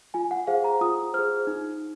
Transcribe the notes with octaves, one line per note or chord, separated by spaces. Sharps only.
F4 G#5
F#5
G#4 C5 F5
A#5
F4 D#6
G#4 C5 F6
D#4